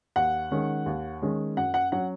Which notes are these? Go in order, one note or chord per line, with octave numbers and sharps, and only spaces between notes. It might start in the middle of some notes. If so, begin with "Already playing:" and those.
D#2 F#5
D#3 G#3 C#4
D#2
D#3 G#3 C#4
F#2 F#5
F#5
F#3 C#4 F#5